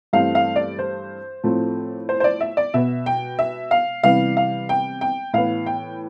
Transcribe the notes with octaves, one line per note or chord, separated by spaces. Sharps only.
G2 E3 A3 C4 F5
F5
D5
C5
A2 F3 A3 C4
C5
C5
D5
E5
D5
B2 B3 E5
G5
E5
F5
C3 E3 G3 B3 F5
F5
G5
G5
A2 E3 B3 F5
G5